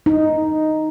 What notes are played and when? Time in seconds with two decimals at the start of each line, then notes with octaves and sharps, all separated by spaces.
0.06 D#4